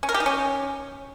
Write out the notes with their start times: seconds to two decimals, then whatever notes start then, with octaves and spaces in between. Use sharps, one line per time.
0.03 C#4
0.09 A#4
0.14 G4
0.20 D#4
0.26 C#4